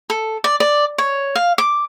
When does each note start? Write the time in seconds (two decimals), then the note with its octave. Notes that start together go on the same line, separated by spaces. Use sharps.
0.10 A4
0.44 D5
0.60 D5
0.98 C#5
1.35 F5
1.58 D6